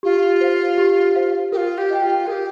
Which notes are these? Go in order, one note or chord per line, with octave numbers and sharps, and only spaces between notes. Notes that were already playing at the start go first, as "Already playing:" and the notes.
F4 G4
C5 F5
G4
C5 F5
F4 G4 A#4
G4
D#5 G5
F4
G4 G#4 A#4